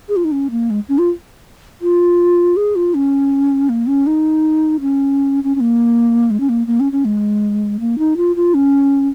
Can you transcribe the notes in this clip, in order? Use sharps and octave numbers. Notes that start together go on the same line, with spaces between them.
G#4
F4
D#4
C#4
A#3
G#3
C#4
F4
F4
G#4
F4
C#4
A#3
C#4
D#4
C#4
C#4
C#4
A#3
G#3
C#4
A#3
A#3
C#4
C#4
G#3
A#3
D#4
F4
F4
C#4